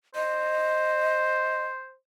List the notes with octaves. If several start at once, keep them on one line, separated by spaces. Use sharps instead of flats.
C5 D#5